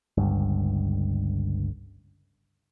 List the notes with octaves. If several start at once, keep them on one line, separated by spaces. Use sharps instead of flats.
G1 C#2 G2